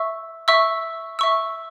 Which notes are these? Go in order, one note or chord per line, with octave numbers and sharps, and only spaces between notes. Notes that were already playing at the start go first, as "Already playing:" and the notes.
Already playing: E5 C#6 E6
E5 C#6 E6
E5 C#6 E6